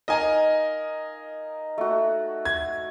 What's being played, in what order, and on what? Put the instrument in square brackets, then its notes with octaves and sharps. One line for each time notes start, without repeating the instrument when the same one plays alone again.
[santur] D#4 A#4 F5 [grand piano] D#5 G#5 A#5
[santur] A3 F#4
[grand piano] G#6